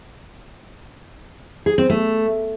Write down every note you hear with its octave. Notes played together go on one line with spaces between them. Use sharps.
G#4
C4
A3